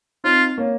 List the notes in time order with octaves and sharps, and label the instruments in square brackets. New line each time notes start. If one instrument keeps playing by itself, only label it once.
[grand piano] C4 D#4 [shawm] F4
[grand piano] A#3 C#4